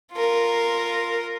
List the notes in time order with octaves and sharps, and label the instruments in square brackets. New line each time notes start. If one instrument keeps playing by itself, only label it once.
[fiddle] F4 A#4